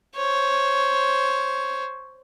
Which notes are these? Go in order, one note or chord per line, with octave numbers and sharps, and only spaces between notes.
C5 C#5